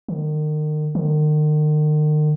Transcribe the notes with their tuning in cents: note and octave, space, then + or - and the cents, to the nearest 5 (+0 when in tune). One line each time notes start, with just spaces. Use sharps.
D#3 -35
D#3 -40